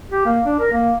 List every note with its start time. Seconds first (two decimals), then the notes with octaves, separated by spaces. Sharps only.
0.10 G4
0.25 A#3
0.45 D4
0.59 A#4
0.72 A#3